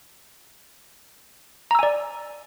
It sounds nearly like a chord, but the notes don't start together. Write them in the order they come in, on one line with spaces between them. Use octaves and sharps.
A#5 E6 G#5 D5